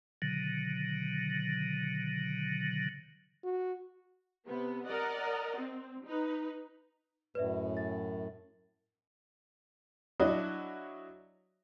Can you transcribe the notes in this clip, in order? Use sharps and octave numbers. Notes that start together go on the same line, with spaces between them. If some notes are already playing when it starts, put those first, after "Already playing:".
B2 D3 D#3 F#3
F#4
C3 B3
A#4 D5 D#5 F#5
C4
D#4 B4
F#2 A2 B4 D5 E5
A6
F#3 D4 E4 F#4 D#5